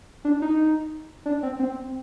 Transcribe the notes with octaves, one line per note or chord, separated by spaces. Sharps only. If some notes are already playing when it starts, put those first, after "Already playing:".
D4
D#4
D4
C4
C4